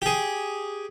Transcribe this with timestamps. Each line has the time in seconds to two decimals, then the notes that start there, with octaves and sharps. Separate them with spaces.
0.02 G4 G#4